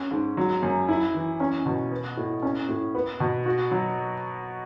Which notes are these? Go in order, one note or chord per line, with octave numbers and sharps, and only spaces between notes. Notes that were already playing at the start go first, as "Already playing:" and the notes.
Already playing: C#4
G#2
F#3
F#2
E4
E3
C#4
B2
B3
A2
C#4
A2
B3
B2
F#4
F#3